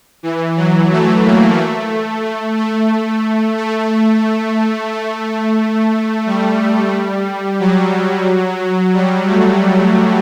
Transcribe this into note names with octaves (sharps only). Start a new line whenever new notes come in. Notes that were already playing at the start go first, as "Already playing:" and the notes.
E3
F#3
A3
A#3
A3
A3
A3
A3
A3
G3
F#3
G3
A3